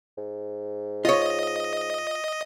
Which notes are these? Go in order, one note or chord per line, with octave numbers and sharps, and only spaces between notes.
G#2
F4 C#5 D#5